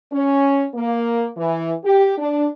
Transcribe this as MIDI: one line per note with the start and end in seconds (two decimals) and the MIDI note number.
0.13 0.65 61
0.75 1.27 58
1.37 1.72 52
1.84 2.15 67
2.18 2.47 62